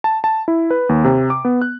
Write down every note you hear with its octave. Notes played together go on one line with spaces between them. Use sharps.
A5
A5
E4
B4
D#2
C3
D6
B3
F#6